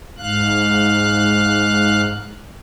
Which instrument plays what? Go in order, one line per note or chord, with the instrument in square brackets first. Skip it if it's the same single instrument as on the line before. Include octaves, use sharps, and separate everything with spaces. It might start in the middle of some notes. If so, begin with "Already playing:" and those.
[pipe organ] G#2 F5 F#6